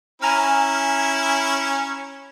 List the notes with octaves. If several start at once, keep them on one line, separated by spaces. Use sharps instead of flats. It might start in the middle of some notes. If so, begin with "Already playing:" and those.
C#4 E4 G#5 A#5 F6